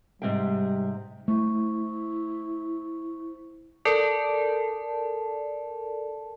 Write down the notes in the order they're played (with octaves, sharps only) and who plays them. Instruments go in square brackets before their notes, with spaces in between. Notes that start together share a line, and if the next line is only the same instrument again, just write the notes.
[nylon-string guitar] G#2 C3 G5 [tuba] G3
[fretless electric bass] A3 [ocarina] E4 [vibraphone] C5 C#6
[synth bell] A4 A#4 D5 A5